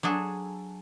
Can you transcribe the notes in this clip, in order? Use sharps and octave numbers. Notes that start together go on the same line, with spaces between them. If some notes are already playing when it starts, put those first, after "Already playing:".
F#3 D4 G#4 A4